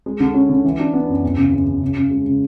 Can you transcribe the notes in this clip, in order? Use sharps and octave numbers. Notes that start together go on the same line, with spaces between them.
G#3
D3
C#4
D3
E3
D4
B3
F#2
E2
C#3
E2
E2
C#3
C#3
G#3
C#3